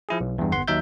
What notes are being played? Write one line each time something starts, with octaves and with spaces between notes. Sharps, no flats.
F3 E4 G#4
B1
E2 G2
G1 B3 F#5 C6
D#2 F#3 D#4 E5 G6